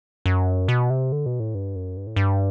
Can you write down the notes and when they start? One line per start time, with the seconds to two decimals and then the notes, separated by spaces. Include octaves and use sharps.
0.26 F#2
0.68 B2
0.90 C3
1.12 D3
1.26 B2
1.40 A2
1.55 G2
1.75 F#2
1.97 G2
2.07 A2
2.16 G2